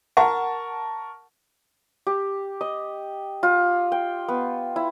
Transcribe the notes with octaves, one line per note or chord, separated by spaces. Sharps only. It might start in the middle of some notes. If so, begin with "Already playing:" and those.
A#4 F#5 A5 C#6
G4
D#5
F4
G5
B3
E4